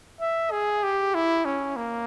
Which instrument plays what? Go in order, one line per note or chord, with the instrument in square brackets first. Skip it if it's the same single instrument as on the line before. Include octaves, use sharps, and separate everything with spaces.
[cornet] E5
G#4
G4
E4
C#4
A#3